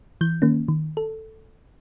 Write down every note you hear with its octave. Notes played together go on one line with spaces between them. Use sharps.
E3 G6
D#3 A#3 C#4
D#3
A4